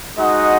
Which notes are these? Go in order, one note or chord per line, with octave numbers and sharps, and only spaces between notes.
G#3 D#4 F#4 D#5 F#5